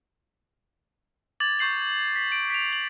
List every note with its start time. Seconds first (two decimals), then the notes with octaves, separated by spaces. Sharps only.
1.40 D6 G#6 A6 F#7
1.59 C#6 G6 C7 F#7
2.16 B6
2.32 D7
2.50 B6 D7 F7
2.73 F#7